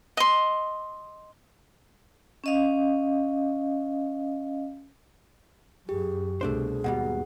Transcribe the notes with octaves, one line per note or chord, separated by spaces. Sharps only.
D#5 C6
C#4 D#5 F5
F#2 G4 G#4
C2 B2 A3 D4 G#4 C5
D#2 G#2 B2 G3 F#5